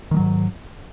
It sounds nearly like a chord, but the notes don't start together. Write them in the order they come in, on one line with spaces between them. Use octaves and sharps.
D#3 G3 F#3 G#2